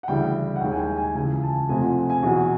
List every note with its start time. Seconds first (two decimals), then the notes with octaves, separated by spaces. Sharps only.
0.03 F#5
0.08 D2 C#3 E3 G3 G5
0.56 F#5
0.61 D#2 D#3 G#3 G5
0.72 G#5
0.79 G5
0.97 G#5
1.15 C#2 C#3 E3 G#5
1.43 A5
1.69 F2 C3 F3 A3 G#5
1.82 F#5
2.10 G#5
2.23 E2 B2 F#3